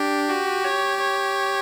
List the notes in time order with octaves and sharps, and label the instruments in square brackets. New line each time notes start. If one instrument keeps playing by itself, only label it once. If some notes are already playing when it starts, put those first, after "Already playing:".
Already playing: [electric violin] D4 [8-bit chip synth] G4
[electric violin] F#4
C#5
C#5